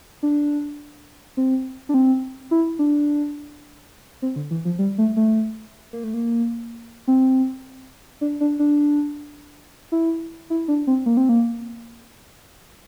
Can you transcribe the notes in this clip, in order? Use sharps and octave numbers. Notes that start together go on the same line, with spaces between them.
D4
C4
D4
C4
E4
D4
C4
D3
E3
F3
G3
A3
A3
A#3
A3
A#3
C4
D4
D4
D4
E4
E4
D4
C4
A#3
C4
A#3